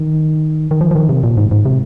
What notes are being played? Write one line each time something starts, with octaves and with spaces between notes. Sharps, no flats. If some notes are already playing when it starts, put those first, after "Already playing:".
Already playing: D#3
D#3
F3
F3
D#3
C3
A#2
G#2
G#2
C3